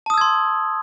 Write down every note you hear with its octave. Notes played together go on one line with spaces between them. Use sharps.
A5 C6 D#6 E6 G#6